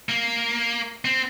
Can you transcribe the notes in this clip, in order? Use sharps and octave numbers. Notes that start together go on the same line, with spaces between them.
A#3
C4